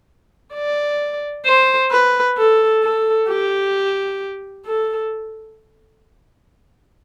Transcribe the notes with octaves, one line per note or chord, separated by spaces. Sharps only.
D5
C5
B4
A4
A4
G4
A4